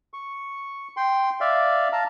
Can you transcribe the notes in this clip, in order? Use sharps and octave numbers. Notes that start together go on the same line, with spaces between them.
C#6
G5 C6
D5 E5 F5
F5 A5 A#5